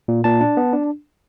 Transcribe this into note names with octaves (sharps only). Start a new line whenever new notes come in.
A#2
A#2 A5
D4
B3
D4